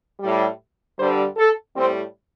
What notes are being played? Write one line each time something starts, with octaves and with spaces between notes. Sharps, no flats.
A2 G3
G2 D3 G3 C5
A4
A2 G3 C4